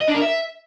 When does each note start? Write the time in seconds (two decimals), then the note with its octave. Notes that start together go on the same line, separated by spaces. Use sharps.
0.01 D#5
0.08 D4
0.15 A#4
0.21 E5